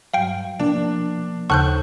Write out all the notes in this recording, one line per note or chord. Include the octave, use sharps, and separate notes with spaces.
G2 F#3 F5 G5
B2 F3 A#3 D4
D#2 C#3 A4 C5 A5 C#6 F#6 G6